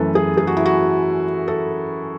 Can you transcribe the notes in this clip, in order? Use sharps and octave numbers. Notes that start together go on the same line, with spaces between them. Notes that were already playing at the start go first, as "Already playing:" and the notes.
Already playing: F#2 E3 A3 A4 B4
G#4
G#4
F#4
E4
F#4
A4